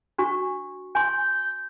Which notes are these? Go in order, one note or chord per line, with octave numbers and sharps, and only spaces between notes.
D4 F#4 C#6
G#5 C6 G6